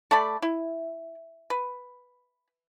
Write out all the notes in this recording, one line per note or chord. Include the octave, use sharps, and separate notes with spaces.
A3 A4 D5 B5
E4
B4